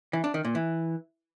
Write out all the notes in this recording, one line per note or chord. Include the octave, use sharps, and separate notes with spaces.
E3
D4
D#3
A#2
E3